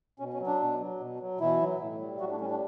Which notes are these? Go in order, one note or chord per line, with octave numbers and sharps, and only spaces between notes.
B2 C#4
C#4
F#3
D4
B2
F#3
B2
F#3
B2 E3 E4
F#3
A2
G3
A2 F#3 F#4
D4
G3 C#4
D4